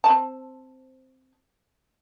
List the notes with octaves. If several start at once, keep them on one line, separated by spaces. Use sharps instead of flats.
C4 A5